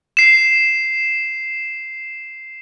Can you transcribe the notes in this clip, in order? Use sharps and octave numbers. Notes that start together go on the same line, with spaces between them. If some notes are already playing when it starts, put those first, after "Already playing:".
C7 E7